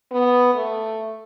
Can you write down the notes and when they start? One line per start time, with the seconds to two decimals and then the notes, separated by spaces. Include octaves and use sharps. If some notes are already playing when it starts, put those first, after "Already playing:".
0.12 B3
0.55 A3